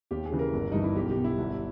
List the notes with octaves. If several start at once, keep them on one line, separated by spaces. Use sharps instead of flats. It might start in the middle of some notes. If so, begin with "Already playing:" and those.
D#2 G4
G#4
C#3 E3
A#4
G1
G2 E3 D#4
E4
B1 G4
G4
B2
E4
G1